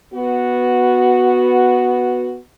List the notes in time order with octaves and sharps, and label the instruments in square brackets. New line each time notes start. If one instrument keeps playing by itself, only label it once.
[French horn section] B3 F#4